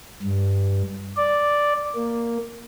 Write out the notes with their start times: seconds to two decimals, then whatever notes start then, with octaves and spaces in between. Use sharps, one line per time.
0.22 G2
1.17 D5
1.96 A#3